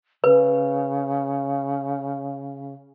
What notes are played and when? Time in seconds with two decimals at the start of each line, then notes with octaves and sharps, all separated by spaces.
0.24 C#3 B4